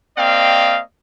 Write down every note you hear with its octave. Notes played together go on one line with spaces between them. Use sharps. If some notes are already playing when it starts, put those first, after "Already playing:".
A#3 C4 D5 D#5 F5 G5